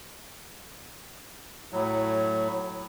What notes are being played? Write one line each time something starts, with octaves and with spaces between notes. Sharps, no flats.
A2 F#3